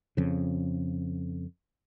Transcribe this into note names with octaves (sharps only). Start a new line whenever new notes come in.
F2 C#3